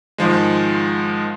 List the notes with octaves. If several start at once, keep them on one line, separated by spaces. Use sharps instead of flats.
G#2 D#3 F3 G#3